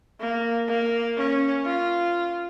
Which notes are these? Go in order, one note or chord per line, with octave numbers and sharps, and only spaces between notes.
A#3
A#3
C#4
F4